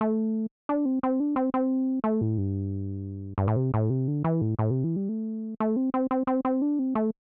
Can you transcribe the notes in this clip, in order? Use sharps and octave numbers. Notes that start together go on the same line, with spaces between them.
A3
D4
C4
C4
D4
C4
C4
A3
A2
G2
G2
A2
C3
A2
C3
D3
E3
A2
A2
C3
E3
G3
A3
A3
C4
C4
C4
C4
C4
D4
C4
A3